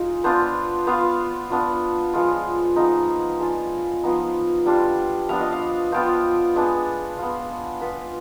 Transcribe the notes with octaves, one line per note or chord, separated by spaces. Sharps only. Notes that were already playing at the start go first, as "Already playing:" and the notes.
Already playing: G#3 D#4 F4
B3 D4 F4 C5
B3 F4 F5
B3 D4 F4
F3 G#3 B3 F4
F3 G#3 B3 D#4 D#5
G#3 D4 F4
F3 B3 D#4
G3 D4 F4
F3 B3 D4 F5
D#5
F5
F3 B3 F4 G5
G#3 B3 D4
B3 F4
B3 F4 B4